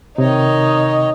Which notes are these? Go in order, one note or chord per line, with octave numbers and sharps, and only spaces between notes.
C3 D#3 D#4 C#5 D#5